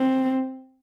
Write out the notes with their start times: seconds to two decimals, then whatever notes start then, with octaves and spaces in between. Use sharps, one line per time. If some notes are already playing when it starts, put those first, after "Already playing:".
Already playing: C4